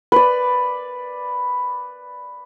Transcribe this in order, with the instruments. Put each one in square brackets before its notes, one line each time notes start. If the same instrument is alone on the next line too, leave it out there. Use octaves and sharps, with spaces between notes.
[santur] B4 D5